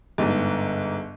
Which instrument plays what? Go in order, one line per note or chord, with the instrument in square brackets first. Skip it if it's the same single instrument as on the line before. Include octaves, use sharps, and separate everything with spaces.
[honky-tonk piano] G1 G#2